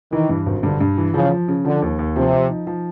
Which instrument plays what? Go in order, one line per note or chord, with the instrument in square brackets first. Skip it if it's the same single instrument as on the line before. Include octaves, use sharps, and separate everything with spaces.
[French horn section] D#3 [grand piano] E3
[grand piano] G2
G#1
[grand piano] G2 [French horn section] D3
[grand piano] G2
E3
[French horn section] C#3 [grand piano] F3
[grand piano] F3
C#3
[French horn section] D3 [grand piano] F3
[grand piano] D#2
D#2
[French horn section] C3 [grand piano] F3
[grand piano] F3
D#4
F3